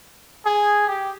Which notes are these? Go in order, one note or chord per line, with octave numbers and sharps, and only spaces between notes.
G#4
G4